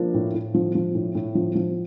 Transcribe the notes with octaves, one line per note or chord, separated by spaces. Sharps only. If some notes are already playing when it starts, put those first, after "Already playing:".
Already playing: F3 A#3 D4
A2
A2
F3
F3
A2
A2
F3
F3